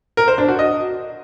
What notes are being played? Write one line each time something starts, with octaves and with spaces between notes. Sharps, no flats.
A#4
C5
D4
F#4
D#5